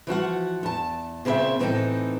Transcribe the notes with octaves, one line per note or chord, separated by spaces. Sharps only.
E3 F3 F#4 F#5
E2 A5
A#2 C#3 C4 B4 C5 E5
A2 E3 C4 C#4 D#4 A4